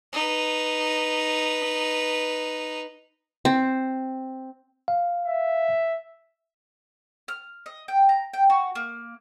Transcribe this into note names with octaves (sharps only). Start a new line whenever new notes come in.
D#4 B4
C4
F5
E5
F6
D#5
G5
A#5
G5
F#4
A#3